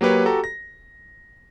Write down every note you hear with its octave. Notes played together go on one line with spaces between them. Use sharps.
F#3 A#3 G4 B4 C#5
F#4 G4 A4 A#5
A#6